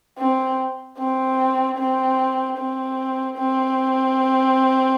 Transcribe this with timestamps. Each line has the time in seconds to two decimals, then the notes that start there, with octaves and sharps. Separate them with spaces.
0.18 C4
0.98 C4
1.78 C4
2.58 C4
3.38 C4